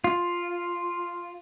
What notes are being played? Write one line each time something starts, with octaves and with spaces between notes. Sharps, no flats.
F4